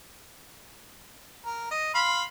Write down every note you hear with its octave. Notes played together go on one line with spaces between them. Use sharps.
A#4
D#5
F5 B5 C6